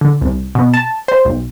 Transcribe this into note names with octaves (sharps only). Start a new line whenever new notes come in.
D3
C2
B2
A5
C5
B1